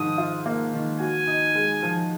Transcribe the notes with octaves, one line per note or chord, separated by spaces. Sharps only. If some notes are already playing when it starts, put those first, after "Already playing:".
Already playing: G#2 D#3 F3 D#6
F4
A#3
D#3
F#4 G#5
D#4
G#3
F3